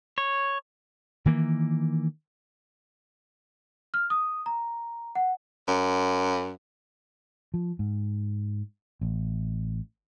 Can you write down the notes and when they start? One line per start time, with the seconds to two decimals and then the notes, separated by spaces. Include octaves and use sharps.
0.18 C#5
1.26 D#3 E3 A#3
3.94 F6
4.10 D#6
4.46 A#5
5.15 F#5
5.68 F#2
7.54 F3
7.79 G#2
9.01 A1